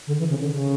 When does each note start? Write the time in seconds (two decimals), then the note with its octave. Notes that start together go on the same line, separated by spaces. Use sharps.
0.07 D3
0.19 E3
0.30 C#3
0.41 D3
0.53 C#3